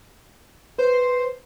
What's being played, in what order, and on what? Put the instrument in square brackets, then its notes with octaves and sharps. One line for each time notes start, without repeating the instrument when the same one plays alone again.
[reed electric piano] B4 [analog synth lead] C5